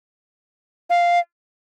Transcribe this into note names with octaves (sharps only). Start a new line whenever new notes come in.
F5